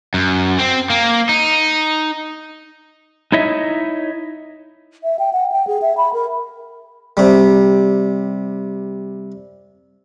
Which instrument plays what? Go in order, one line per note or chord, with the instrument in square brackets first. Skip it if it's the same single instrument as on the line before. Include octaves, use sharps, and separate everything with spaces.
[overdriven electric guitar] F#2
C4
A#3
D#4
[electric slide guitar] D#4 E4 C#5 D#5 E5
[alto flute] E5
G5
F#5
G5
G#4
E5
B5
A#4
[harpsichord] C3 G3